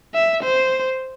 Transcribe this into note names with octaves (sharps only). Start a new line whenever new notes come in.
E5
C5